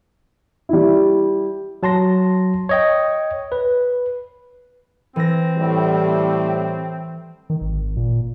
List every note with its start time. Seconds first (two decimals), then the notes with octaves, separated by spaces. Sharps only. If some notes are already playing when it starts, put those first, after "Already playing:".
0.69 G3 E4
1.83 F#3 A5 C6 A#6
2.69 C#5 D#5 G5
3.52 B4
5.16 E3 C4 A#6
5.57 A2 G3
7.50 D#3
7.61 G#1
7.97 A#2